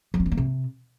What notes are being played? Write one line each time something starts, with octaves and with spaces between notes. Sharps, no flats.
F3
C#4
E3
A#3
C3